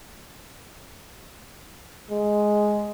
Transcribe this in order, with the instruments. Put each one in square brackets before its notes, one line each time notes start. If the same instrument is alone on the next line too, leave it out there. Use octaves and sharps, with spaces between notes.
[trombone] G#3